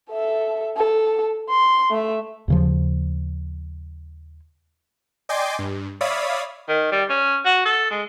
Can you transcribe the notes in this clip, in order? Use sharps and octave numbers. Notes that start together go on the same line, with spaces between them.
A4 E5
A4
C6
A3 E5
D#2 C#3 F3
D5 D#5 G5 G#5 C6 D6
G2
C#5 D5 E5 F5 B5 D#6
D#3
G3
C#4
F#4
A4
G#3